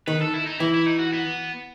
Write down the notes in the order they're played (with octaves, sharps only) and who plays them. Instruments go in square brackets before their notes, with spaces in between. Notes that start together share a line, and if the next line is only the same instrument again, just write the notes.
[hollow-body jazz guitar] D#3 [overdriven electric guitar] B4
[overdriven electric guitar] A4
E4
D#4
[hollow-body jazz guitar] E3 [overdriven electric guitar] E4
[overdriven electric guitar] E4
D#4
F#4
B3